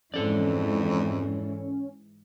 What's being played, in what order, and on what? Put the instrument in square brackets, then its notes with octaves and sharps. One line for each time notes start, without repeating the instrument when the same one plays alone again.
[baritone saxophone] F2 [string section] G#2 E3 [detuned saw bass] C#4 [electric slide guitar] A4 D5